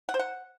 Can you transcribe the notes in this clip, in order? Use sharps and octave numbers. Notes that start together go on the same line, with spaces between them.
F#5
C5
F#5